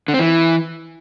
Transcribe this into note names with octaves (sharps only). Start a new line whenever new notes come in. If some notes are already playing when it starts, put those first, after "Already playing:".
D3
C4
E3